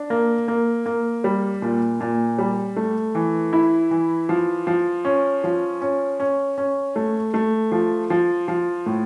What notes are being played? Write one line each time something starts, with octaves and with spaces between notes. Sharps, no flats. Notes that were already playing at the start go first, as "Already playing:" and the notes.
Already playing: D4
A#3
A#3
A#3
G3
A#2
A#2
G3
A3
E3
E4
E3
F3
F3
C#4
F3
C#4
C#4
C#4
A3
A3
F3
F3
F3
A2